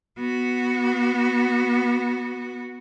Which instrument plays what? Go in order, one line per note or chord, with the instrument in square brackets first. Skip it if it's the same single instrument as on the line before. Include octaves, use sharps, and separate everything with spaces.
[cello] B3 F#4